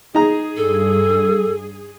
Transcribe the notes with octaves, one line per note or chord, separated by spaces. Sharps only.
D#4 G#4 A#5
G2 A4